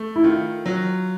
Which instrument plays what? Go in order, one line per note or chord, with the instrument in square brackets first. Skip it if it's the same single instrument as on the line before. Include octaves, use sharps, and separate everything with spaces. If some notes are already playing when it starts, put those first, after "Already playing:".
Already playing: [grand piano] A3
[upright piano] E4
[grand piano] D#3 [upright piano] F4
[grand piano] F#3